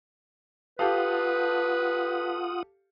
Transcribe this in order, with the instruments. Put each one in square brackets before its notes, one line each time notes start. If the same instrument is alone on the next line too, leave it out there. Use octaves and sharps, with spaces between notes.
[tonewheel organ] F4 F#5 D#6 [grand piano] G4 A4 F5 [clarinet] B4